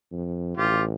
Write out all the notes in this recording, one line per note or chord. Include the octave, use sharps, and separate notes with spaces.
F2
A1 F4 G4